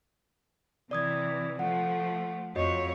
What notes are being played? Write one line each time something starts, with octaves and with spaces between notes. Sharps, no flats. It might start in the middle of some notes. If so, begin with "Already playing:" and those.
C3 E3 D5 D#6 G#6
F3 A3 F#5
F2 F#4 C#5 D#5